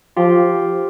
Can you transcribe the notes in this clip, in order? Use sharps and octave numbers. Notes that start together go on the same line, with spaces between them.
F3 F4 G4